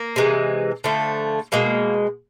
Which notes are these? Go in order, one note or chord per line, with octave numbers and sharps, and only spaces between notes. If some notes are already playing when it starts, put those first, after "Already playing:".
Already playing: A#3
C3 E3 G#3
D3 F3 A3
B2 G#3 A#3